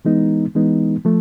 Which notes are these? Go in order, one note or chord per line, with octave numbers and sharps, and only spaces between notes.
E3 G#3 B3 D#4
E3 G#3 B3 D#4
F3 A3